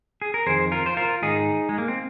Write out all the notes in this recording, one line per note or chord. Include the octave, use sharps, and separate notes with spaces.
G#4
A#4
F2 D#3 G#4 C5
F4 A#4
C5
F4 A#4
G#2 D#3 D#4 G#4
G#3
A#3
C4